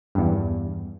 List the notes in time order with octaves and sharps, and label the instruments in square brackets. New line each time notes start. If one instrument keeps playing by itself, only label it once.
[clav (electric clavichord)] E2 G2